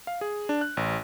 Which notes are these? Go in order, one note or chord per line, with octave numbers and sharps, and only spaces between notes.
F5
G#4
D4
F#6
A1